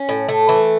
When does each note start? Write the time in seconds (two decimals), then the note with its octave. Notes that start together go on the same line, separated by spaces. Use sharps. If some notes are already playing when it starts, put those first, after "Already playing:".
Already playing: C#4
0.09 A2
0.29 A3
0.49 E3